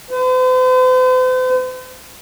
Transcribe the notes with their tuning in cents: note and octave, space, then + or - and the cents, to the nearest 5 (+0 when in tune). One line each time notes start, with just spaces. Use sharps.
C5 -45